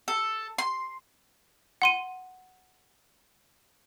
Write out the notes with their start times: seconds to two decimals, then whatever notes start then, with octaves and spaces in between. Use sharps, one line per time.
0.08 A4
0.58 C6
1.82 F#5 C6 D#7